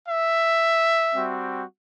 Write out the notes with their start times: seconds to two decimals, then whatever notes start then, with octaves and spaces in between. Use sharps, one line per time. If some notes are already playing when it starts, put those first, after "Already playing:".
0.09 E5
1.14 G3 C4 F#4